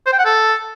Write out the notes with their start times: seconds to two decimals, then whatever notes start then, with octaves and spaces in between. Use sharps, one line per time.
0.06 C5
0.12 G5
0.19 F#5
0.25 A4